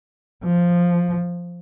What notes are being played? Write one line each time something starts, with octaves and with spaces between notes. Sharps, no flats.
F3